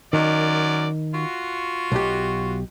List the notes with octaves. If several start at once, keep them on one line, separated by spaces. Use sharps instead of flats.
F#2 D#3 A#4 D5
F4 F#4
B1 G4